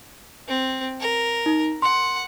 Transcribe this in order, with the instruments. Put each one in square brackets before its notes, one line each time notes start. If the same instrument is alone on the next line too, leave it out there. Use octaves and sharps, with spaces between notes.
[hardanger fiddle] C4
A#4
[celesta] D#4
[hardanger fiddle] F#5 [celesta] C6